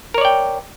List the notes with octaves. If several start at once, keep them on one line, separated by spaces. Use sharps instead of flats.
A#4 C#5 D5 G5